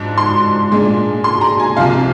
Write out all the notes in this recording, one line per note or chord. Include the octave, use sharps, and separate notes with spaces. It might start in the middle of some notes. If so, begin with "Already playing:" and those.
Already playing: G#2 F3 D4
C6
A#2 G#3 D4
C6
A#5
G#5
C2 C3 F3 F5